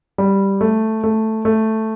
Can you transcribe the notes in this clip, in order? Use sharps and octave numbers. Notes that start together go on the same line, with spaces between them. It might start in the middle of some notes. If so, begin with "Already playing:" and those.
G3
A3
A3
A3